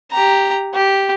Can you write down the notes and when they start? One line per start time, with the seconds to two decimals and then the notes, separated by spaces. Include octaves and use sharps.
0.12 G4 A#5
0.74 G4